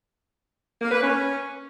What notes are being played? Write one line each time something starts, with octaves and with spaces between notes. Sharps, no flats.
A#3
B4
C#4